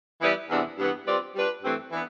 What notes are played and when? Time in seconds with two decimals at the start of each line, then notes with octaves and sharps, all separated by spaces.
0.22 E3 G3 B3 E4 B4
0.50 E2 C3 E3 B3 D4
0.78 G2 E3 B3
1.06 G3 C4 F4 B4 D5
1.36 G3 D4 F4 B4
1.63 G2 E3 A3 C4
1.92 E3 B3 D4